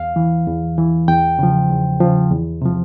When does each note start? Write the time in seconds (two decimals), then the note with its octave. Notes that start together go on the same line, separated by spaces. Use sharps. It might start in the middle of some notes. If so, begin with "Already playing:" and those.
Already playing: E2 F5
0.16 E3
0.47 E2
0.78 E3
1.08 E2 G5
1.39 C#3 F3
1.70 E2
2.00 C#3 F3
2.31 E2
2.62 C3 F3